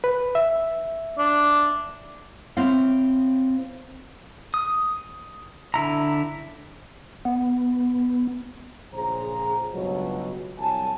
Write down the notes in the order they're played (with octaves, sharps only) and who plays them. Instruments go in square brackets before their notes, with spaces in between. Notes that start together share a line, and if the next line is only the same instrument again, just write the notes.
[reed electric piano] B4
E5
[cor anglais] D4
[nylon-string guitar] C4 E4 C#5 F5
[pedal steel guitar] D#6
D3 E4 A#5
[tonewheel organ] B3
[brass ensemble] A#1 C#3 G#4 C5 A#5
C#2 G2 B2 F#3
C2 F#3 G#5 A5